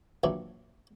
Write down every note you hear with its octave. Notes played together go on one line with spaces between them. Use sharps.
A#1 E3 F#3 D4